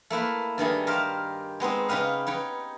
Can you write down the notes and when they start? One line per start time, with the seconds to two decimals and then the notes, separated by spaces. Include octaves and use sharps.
0.10 A3 A#3 E4 B4
0.58 G2 D#3 A3 G#4
0.87 G4 A#4 C5 F5
1.60 G#3 B3 C4 D#4
1.89 C#3 D#4 G4 B4 F5
2.27 D#4 B4 C#5 G5